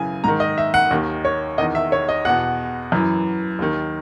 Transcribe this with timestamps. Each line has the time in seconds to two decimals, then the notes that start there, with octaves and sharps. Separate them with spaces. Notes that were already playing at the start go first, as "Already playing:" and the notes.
Already playing: F#2 C#3 E3 G#5
0.24 G#2 D#3 A#5
0.40 D#5
0.58 E5
0.74 F#5
0.91 D#2 D#3
1.25 C#5
1.58 E2 D#3 D#5
1.75 E5
1.92 C#5
2.09 D#5
2.25 E2 B2 F#5
2.92 F#2 E3
3.59 D#2 D#3